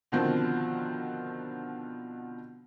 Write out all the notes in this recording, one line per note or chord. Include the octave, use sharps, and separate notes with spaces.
B2 D3 D#3 F3 C4